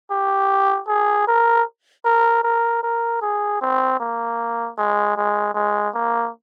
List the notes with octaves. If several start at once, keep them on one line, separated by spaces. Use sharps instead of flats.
G4
G#4
A#4
A#4
A#4
A#4
G#4
C4
A#3
G#3
G#3
G#3
A#3